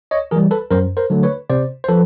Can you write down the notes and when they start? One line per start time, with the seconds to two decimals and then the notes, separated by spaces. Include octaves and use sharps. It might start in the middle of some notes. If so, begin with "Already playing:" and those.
0.11 C#5 D#5
0.31 E3 G3 G#4 A#4
0.51 A4 B4
0.71 F#2 A#4 C5
0.97 A#4 C5
1.10 D3 F#3 A3
1.23 B4 C#5
1.50 C3 C5 D5
1.84 C5
1.89 F3 A4 B4